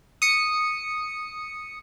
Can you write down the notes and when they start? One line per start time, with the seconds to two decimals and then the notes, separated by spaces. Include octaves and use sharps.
0.22 D#6 C#7